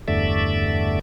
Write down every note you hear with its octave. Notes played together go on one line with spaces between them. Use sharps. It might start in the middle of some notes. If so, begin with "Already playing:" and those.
E2 G2 D3 A3 D5 E5